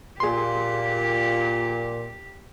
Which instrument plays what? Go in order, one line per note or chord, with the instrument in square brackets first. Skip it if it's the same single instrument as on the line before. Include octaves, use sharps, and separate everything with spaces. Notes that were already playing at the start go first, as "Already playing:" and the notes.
[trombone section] A#2 [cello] G4 [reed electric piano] G#4 C6